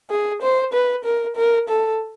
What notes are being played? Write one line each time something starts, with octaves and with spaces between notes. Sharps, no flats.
G#4
C5
B4
A#4
A#4
A4